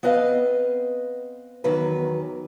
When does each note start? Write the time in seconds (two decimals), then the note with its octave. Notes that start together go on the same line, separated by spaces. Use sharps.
0.03 B3 C4 B4 D#5 F5
1.64 E2 D#3 F#3 B4